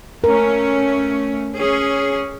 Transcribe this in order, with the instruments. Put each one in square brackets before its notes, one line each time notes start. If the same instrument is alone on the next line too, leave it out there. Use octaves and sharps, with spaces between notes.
[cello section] A3 C#4 [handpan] A#4
[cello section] C#4 G#4